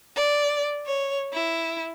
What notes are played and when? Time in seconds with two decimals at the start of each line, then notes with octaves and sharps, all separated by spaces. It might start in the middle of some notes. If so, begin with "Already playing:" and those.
0.16 D5
0.87 C#5
1.34 E4